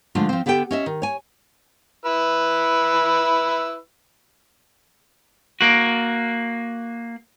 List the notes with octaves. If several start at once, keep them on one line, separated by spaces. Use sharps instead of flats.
D3 F3 G#3 A3 D4 F4
F3 C4
D3 B3 G4 A4 G5
C#4 D#5 E5
D#3
C#5 G#5
E4 B4 E6
A#3 F#4